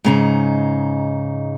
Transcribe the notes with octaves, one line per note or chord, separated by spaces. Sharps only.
G#2 C#3 D#4